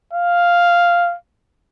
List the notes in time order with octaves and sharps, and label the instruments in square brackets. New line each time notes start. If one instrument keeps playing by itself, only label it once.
[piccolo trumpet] F5